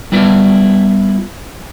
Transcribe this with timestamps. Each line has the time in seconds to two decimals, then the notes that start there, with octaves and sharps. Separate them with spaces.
0.12 G3 B3 E4 F4 B4 D5